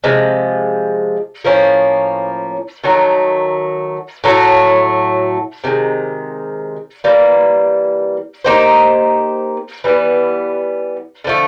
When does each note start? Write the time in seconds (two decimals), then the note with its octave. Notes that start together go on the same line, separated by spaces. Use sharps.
0.04 C3 F3 G#3
1.45 A2 F3 A#3 C#4
2.84 D#3 F#3 A3
4.24 A2 F#3 A3
5.64 C3 D#3 G#3
7.04 E3 G3 A#3
8.44 A#3 D#4 G4 C5
9.84 E3 G3 B3
11.24 D3 F3 A3